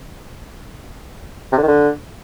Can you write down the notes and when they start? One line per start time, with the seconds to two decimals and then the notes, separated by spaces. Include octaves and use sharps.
1.52 C3
1.58 D3
1.63 D#3
1.68 D3